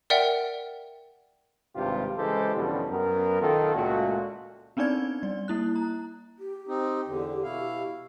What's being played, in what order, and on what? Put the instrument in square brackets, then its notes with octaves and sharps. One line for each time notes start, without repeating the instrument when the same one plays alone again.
[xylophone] A#4 D5 E5 F#5 G5
[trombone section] G#1 G2 C3 F4 G4
C#3 E3 G#3 G4 A4 C5
E2 B2 D3 F3 G3 C#4
F#2 B3 A#4
B1 D#3 B3 F4 A4
C#2 A#2 G#3 A3 F#4
[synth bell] B3 C4 D4 D#4 D5 G#6
G3 D5
A#3 E4 F#6
A#5
[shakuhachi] G4
[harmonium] C4 D#4
E2 D3
B2 E4 F5